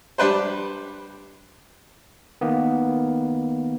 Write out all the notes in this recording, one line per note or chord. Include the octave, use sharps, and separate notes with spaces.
G3 D4 B4 C5
D#3 A#3 B3